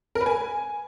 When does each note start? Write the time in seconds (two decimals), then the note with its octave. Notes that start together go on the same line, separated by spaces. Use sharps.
0.15 A#4
0.21 B4
0.26 G#5